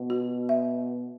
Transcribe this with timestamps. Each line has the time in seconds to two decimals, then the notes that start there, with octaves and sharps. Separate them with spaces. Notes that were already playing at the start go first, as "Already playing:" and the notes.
Already playing: B2
0.10 F#4
0.49 E5